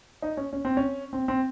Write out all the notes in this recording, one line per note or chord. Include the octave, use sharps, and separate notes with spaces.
D#4
C#4
C#4
C4
C#4
C4
C4